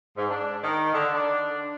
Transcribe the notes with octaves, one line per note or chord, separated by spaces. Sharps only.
G#2
D4
D#3
D3
D4